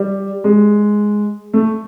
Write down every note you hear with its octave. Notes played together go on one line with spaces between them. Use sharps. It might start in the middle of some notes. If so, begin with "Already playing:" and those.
Already playing: G3
G#3
A3